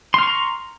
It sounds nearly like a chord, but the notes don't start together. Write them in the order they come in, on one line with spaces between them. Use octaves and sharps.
C6 F6 C#6 A#5